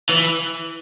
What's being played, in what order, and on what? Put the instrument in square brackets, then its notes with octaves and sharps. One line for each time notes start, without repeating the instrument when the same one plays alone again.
[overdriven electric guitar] E3